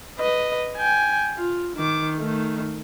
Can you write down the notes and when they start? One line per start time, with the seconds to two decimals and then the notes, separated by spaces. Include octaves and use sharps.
0.19 B4 D#5
0.76 G5 G#5
1.37 F4
1.76 D#3 D6
2.18 D#3 A3